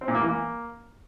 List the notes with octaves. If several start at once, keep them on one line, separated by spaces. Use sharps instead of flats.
C4
A#2
A#3
E3
A#3